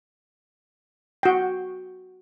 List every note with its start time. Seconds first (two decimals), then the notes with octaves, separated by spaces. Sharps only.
1.23 F#4 G5